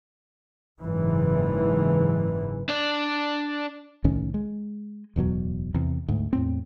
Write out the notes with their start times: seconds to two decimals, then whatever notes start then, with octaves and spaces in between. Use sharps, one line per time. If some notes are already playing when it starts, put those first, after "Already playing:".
0.81 F#1 G#2 E3
2.69 D4 D5
4.04 C2 A2 D#3 C#4
4.34 G#3
5.16 D1 E2 B2 F#3
5.74 E2 C3
6.08 D2 G#2
6.33 E2 A2 C4